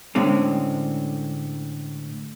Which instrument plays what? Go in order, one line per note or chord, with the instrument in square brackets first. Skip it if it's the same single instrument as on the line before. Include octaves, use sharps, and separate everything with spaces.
[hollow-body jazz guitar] A2 D3 G#3 C4 C#4